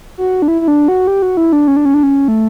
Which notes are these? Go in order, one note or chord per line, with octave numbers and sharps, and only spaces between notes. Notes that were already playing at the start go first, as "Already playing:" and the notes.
F#4
D4
E4
E4
D4
F#4
G4
F#4
E4
D4
C#4
D4
C#4
D4
C#4
A3